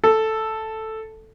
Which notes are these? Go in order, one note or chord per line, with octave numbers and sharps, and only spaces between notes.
A4